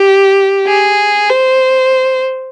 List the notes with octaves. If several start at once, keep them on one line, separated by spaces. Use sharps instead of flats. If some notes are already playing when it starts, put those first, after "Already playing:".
Already playing: G4
G#4
C5